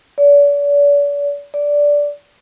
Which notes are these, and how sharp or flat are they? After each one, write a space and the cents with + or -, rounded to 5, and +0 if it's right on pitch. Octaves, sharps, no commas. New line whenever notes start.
D5 -40
D5 -10